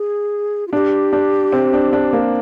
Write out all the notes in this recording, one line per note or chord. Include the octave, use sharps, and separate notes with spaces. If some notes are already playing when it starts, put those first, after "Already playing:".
Already playing: G#4
F4
D4 G4
D4
C4
D4
D4
A#3